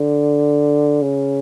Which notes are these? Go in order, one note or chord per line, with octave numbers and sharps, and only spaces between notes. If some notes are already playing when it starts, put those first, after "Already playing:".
Already playing: D3
C#3